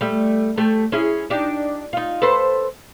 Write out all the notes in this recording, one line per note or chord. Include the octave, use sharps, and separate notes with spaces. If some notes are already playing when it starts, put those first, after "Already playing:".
G3 A3
A3 G4
C#4 E4 G#4
D4 D#4 G4
D#4 F4
A4 B4 C5